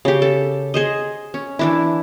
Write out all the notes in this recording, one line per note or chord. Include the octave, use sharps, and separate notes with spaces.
C#3 G4
A4
G#4 C5 D#5
C#4
E3 D4 E4